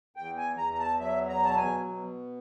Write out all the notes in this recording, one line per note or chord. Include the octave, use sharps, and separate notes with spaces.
E2 G5
G#5
E2 A#5
A#5
A5
F#3 E5
A#5
B2 A5
G#5
B2